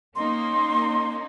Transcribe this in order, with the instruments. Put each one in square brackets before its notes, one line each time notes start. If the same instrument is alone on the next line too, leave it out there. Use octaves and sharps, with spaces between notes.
[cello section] A#3 C#4 D#4 [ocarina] C6